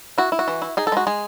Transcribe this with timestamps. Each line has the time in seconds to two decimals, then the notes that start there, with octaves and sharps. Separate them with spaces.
0.18 E4 F#4
0.32 E4
0.39 F#4
0.48 E3
0.62 E4
0.77 D#4 G#4
0.87 A4
0.92 G#3 F#4
1.07 G#3 G#4